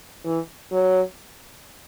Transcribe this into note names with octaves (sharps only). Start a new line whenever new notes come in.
E3
F#3